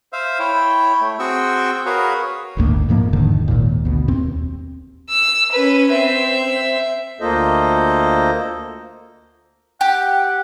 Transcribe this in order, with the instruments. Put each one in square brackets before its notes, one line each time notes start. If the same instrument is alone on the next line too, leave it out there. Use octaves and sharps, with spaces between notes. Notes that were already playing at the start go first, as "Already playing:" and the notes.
[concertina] C5 E5 F5
E4 C#5 G5
A3
C4 F#4 G#4 G5 C#6 E6
F#4 G#4 A#4 B4 C#5 F5
[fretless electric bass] G1 D2 A2 A#3
F2 G#2 F3 A#3
E1 G#2 D3 D#3
G#1 D#2 A#2
D2 B2
D#2 C4
[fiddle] E6
C#4 B4
C4 E5
[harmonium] D2 A#3 F4 A4 C5 D#5
[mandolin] G4 [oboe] F#5